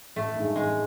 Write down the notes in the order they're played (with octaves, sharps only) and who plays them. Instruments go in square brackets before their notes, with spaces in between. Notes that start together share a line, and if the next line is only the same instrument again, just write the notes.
[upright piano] A1 [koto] A3
[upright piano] G2 D#3 G#3
[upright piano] A1 [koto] G#3